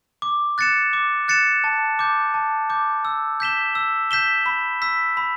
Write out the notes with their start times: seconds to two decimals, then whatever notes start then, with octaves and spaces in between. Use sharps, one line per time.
0.22 D6
0.58 F#6 A6 C#7 E7
0.93 D6
1.28 F#6 A6 C#7 E7
1.64 A5
1.99 D6 G6
2.34 A5
2.70 D6 G6
3.05 E6
3.40 G6 B6 E7 G7
3.75 E6
4.11 G6 B6 E7 G7
4.46 B5
4.82 E6 B6
5.17 B5